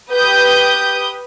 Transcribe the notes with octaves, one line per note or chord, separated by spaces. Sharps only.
G4 B4 D#6 G6